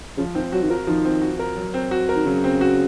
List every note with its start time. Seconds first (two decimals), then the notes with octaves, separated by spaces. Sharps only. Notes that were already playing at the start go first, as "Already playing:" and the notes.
0.18 C#3 F3
0.35 D#3 C4
0.52 F#3 F#4
0.63 D#3
0.70 F3 A#4
0.87 D#3 F3
1.05 C4
1.22 F#4
1.39 A#4
1.57 F#3
1.74 C4
1.91 F#4
2.09 A#4
2.16 D#3
2.26 C#3 F#3
2.44 C4
2.61 F#4